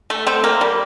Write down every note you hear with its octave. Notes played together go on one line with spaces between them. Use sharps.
A3
A3 C4
A#3
G3